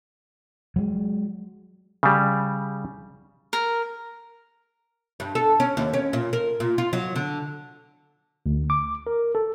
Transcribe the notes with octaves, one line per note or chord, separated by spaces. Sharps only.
F#3 G#3
C#3 G3
A#4
G2
A4
C#4
D#2
C#4
A#2
A#4
A#2
F4
F#3
D3
D2
D6
A#4
A4